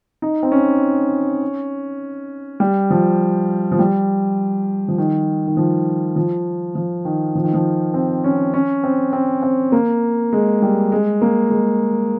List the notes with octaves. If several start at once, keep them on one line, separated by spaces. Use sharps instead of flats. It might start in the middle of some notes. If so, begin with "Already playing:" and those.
D#4
C4
C#4
G3
F3
F3
G3
F3
D#3
D#3
F3
F3
F3
D#3
F3
D#3
F3
C4
C#4
C#4
C4
C4
C4
A#3
G#3
G3
G#3
A#3
G#3